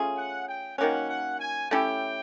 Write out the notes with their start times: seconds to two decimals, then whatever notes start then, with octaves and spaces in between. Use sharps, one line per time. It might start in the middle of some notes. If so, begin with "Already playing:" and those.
Already playing: A3 C#4 F4 G#4
0.17 F#5
0.48 G5
0.78 D#3 F#3 A#3 C#4 F#5
1.09 F#5
1.40 G#5
1.71 A3 C#4 E4 G4 G5